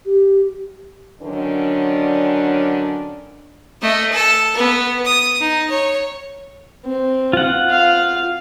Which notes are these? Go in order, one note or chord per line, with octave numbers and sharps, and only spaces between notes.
G4
D3 D#3 F#3 C#4 D4
A3 D#5
A4
B3
D#6
D#4
C#5
C4
F4 F#5
F5